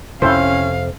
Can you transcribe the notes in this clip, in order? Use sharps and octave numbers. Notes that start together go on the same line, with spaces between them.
F2 C3 C#4 E4 A4 C5 F5